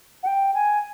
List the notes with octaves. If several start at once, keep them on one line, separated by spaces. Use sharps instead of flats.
F#5
G5
G#5